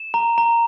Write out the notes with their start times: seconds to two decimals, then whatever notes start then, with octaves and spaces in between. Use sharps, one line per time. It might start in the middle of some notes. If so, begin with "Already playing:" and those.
Already playing: E7
0.14 A#5
0.38 A#5